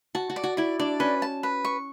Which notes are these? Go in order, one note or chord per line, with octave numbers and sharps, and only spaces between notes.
F#4 A5
F#4
D5
F#4
E4 D5
D4 D5
C#4 B4
A5
B4
C#6